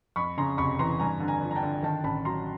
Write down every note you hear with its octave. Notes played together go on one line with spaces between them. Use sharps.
F2 B5 C#6
C#3 A#5 C6
F1 B5 C#6
E3 A#5 C6
G2 G#5 A#5
D3
G#5 A#5
F3
A#5
G5 A5
D3
D#3 G5 A5
A1 A5 B5
F#3 A#5 C6